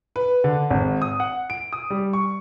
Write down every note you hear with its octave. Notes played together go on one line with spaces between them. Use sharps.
B4
D3
G#1
D#6
F#5
D7
D#6
G3
C#6